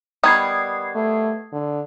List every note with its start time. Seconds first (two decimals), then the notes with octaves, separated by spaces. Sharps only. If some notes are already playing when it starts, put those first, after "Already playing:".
0.23 D#3 G3 B3 D#6 G#6 C7
0.95 A3
1.53 D3